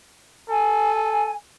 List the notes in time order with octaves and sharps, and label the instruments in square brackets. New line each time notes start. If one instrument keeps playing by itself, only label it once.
[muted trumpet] A4 [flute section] G#5